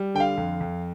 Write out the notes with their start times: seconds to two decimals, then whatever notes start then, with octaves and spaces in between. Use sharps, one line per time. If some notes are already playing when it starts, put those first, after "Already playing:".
Already playing: G3
0.15 D3 G5
0.20 F5
0.37 F2
0.60 F2